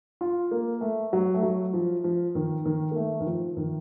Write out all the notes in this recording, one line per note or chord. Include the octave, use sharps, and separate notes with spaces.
F4
A#3
A3
F#3
A3
F#3
F3
F3
D#3
D#3
A#3
A3
D#3
F3
D#3